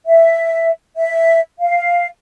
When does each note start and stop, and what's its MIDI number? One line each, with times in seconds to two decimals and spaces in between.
0.06 0.70 76
0.97 1.40 76
1.60 2.06 77